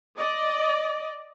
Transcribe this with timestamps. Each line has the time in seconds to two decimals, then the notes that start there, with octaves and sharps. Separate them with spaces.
0.17 D5 D#5